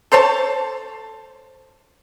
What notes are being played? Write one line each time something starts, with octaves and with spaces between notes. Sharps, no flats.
A4 C5 C#5 A5